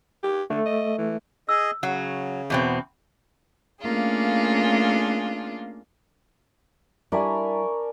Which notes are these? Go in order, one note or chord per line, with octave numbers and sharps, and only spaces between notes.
G4
D3 A3
D#5
E3
G#4 D#5 E6
C#3 F#3 F#5
E2 B2 C4
A3 A#3 C#4 D4 F4 G#4
G3 D4 E4 A#4 G#5 A#5 B5 C#6